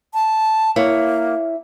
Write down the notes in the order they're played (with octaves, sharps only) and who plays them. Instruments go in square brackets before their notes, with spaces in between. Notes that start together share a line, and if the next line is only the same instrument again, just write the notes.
[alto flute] A5
[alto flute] A#3 [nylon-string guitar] E4 C#5